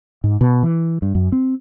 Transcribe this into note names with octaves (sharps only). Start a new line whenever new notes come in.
G#2
B2
E3
G2
F#2
C4